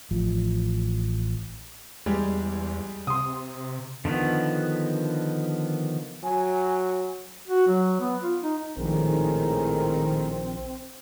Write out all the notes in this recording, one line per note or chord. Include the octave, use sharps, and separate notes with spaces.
A1 F3
E2 G3 G#3 G4
C3 C6 D#6
D3 D#3 F3 B3
F#3 G#5
F#4
F#3
B3
F4
D#4
A#1 A2 D#3 G#3 C4 A#4